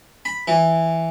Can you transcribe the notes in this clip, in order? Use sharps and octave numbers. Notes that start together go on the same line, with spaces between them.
B5
E3